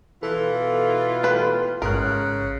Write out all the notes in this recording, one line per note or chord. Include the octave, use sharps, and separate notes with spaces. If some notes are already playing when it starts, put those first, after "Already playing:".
B2 E3 B3 F4 A4
G4 B4
A1 G#2 C#3 A#4 F#6